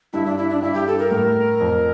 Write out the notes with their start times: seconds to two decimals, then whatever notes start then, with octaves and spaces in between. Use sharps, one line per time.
0.13 G2 E4
0.26 D4
0.38 E4
0.50 D4
0.62 G2 E4
0.74 G4
0.87 A4
0.99 A#4
1.11 A2
1.60 F2